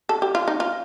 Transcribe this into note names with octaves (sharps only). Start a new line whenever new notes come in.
A4
G4
F4
D#4
F4